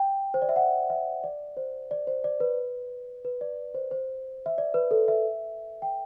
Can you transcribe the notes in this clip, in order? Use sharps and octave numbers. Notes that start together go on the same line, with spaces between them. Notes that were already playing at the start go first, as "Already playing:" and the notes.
Already playing: G5
C5
D5
E5
F#5
E5
D5
C5
D5
C5
D5
B4
B4
D5
C5
C5
E5
D5
B4
A4
E5
G5